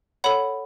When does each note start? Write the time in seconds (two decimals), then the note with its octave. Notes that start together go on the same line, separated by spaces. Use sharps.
0.24 A4 C#5 F#5 B5